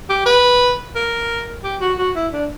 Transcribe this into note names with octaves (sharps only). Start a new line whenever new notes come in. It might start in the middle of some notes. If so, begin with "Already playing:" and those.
G4
B4
A#4
G4
F#4
F#4
E4
D4